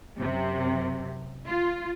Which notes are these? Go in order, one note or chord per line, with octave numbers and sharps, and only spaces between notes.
F#2 C3
F4